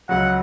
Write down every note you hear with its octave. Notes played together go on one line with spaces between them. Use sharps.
C#2 C#3 F#3 F#5